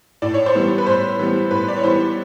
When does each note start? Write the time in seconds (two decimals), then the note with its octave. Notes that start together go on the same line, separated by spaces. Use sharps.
0.22 A2 D5
0.34 C#5
0.46 C5 D5
0.55 E3 G3 B3
0.78 B4
0.87 A2 C5
1.19 E3 G3 B3
1.51 A2 B4
1.68 D5
1.76 C#5
1.83 E3 G3 B3 C5